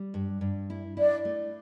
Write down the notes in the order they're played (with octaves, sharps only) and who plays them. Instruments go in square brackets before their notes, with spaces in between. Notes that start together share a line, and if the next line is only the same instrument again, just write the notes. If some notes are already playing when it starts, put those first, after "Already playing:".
Already playing: [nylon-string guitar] G3
G2
G2
E4
[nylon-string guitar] E4 [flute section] D5
[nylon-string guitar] A3